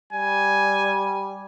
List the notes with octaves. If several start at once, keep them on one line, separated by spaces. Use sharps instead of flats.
G3 G#5